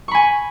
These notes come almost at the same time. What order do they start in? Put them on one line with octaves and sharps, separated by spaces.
C#6 B5 G#5